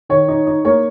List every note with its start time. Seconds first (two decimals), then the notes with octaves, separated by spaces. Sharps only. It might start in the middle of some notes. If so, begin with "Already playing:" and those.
0.09 D#3 C#5
0.28 D#4
0.47 D#4
0.65 A#3 C#5